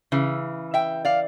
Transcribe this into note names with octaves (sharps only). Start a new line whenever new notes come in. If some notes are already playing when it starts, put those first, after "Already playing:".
C#3 E3
E5 G5
D5 F5